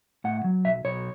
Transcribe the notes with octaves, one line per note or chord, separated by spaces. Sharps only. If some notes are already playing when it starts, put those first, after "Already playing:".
A2 F#5
F#3
B1 E5
B1 C#5